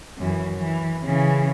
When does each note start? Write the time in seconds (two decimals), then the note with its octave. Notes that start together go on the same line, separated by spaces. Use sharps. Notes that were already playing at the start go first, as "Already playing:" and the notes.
0.18 F#2 E3
0.56 E3
1.04 C#3 E3